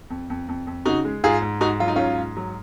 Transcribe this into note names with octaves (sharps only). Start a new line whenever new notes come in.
F2
F2
F2
F2
C#3 D#4 F#4
G#3
G#2 F4 G#4
G#2
G#2 D#4 F#4
F#3 F4
D#4
G#2 C#4 F4
G#2
F#3